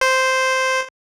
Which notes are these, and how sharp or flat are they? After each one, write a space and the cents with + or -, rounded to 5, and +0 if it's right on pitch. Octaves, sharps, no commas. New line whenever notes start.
C5 -5